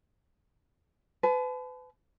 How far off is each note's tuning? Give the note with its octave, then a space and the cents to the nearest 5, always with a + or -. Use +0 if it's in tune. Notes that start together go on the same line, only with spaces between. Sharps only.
B4 +35 A5 -40